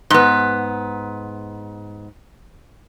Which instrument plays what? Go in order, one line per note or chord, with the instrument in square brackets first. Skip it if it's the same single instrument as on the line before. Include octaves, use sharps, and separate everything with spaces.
[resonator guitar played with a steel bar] G#2 B3